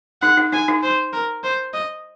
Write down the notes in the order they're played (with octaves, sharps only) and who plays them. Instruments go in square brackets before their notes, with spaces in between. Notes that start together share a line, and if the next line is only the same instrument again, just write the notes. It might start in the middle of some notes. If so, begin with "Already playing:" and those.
[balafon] D#4 [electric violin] F#5
[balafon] D#4
[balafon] D#4 [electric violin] G#5
[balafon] D#4
[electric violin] C5
A#4
C5
D#5